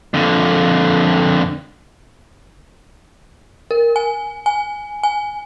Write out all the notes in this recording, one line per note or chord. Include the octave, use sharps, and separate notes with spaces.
F2 D3
A#4
G#5
G#5
G#5